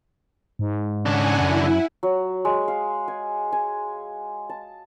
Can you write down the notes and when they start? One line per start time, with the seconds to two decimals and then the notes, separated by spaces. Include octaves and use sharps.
0.59 G#2
1.06 C#3 D4 F#5 G#5
1.41 F#2 E4
2.03 F#3
2.45 G#3
2.68 F5
3.08 G#5
3.52 G#5
4.49 A5